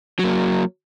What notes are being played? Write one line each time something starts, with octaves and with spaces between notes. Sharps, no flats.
F#3 A#3